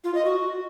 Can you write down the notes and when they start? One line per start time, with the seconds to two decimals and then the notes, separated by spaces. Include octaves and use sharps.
0.04 F4
0.15 D#5
0.25 F#4